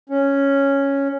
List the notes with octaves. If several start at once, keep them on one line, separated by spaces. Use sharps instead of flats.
C#4